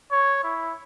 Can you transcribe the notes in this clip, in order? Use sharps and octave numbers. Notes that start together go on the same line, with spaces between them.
C#5
E4